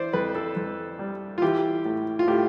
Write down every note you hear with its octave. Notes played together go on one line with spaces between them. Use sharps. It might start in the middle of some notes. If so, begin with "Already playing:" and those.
Already playing: E3 C5 D5
F2 B4
A4
F2
G3
F4
E3 G4
A2
F4
A2 G4